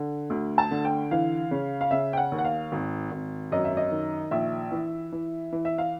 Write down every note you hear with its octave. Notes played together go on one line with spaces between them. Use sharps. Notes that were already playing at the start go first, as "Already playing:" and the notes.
Already playing: D3
D2
A5
D3
G5
E3 F5
C#3
F5
C#3 E5
G5
F#5
D#2
F#5
F5
G#1
G#1
F#2 D#5
E5
D#5
D#3
A#1 E5
E3
E3
E3
E5
F5